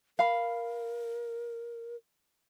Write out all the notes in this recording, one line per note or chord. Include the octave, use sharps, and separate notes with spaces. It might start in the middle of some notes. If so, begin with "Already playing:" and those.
A#4 F5 B5